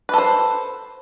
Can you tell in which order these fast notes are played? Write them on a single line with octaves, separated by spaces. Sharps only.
B4 A4 C5